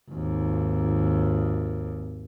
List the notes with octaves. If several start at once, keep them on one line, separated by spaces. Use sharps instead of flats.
G#1 D#2